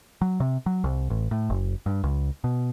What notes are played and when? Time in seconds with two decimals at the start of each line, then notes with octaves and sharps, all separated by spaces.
0.21 F#3
0.40 C3
0.66 F#3
0.84 C2
1.10 A1
1.31 A2
1.50 F#1
1.86 G2
2.04 C#2
2.44 B2